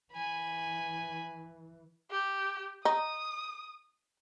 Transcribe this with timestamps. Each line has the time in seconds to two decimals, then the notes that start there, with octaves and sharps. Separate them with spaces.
0.13 E3 G#5 B5
2.11 G4
2.85 D#4 D#6